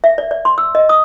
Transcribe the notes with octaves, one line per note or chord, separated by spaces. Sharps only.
E5
D5
D5
C6
E6
D#5
D#6